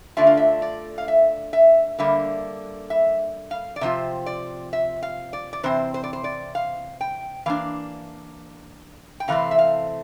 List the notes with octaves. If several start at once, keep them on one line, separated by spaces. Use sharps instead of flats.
D3 A3 D4 F4 E5
F5
E5
D5
F5
E5
E5
D3 G3 A#3 E5
E5
F5
D5
C3 F3 C4 F4 E5
D5
E5
F5
D5
D5
C3 E3 C4 C5
C5
D5
C5
D5
F5
G5
E3 A#3 D4 F5
G5
C3 E3 A3 C4 F5
E5
F5